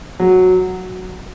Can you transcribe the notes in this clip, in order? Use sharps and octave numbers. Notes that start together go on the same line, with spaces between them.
F#3